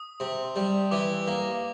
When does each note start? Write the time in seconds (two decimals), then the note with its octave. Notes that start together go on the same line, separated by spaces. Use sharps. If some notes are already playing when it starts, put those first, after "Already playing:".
Already playing: D#6
0.20 C3
0.56 G3
0.91 E3 D6
1.27 A#3